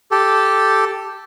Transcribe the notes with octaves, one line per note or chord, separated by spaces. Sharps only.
G4 A4